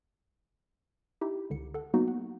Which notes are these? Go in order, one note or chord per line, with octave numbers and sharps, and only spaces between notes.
D#4 E4 G4 E5
C#2 D3 C#7
A4 F#5
F#3 A#3 B3 D#4 F#4
F#5